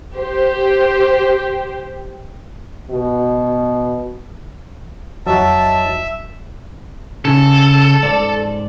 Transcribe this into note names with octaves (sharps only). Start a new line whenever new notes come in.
G4 C5
B2
F2 F#3 F#4 D#5 E5 A5 E6
C#3 A4
G#2 D5